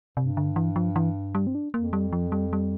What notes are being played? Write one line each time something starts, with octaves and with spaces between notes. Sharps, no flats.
G2 C3
D3
E3
F3
E3
G3
C4
D4
F2 A#3
G3
F3
G3
G3